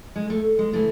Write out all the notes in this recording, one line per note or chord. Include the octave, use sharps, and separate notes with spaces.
G#3
A3
G#3
C#3 E3 A3